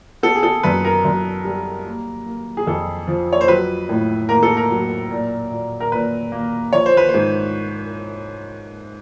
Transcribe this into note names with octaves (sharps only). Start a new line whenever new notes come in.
B3 A4
G#4
A4
F#2 B4
A#4
F#2
G3
A#3
A#3
G#4
F2 A4
F3
C#5
C5
F#3 B4
A2
A#3 A#4
A4
A#4
F#3
A#2
A#2
A#4
A#2 B4
A#3
F3 C#5
C5
B4
C5
G#2